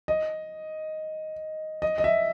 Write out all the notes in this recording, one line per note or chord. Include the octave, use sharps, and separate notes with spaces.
D#5
D#5
D#5
E5